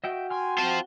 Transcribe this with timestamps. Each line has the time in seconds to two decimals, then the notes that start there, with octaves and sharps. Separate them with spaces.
0.04 F#4 D#5 E5 G5
0.30 G5 G#5 C6 F6
0.58 C4 F4 C5 A5